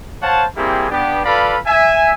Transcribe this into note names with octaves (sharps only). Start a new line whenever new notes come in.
C5 C#5 F5 F#5 A5
G3 A#3 C4 E4 G4 G#4
B3 D4 G4
F4 A4 B4 D5 F5 B5
E5 G#5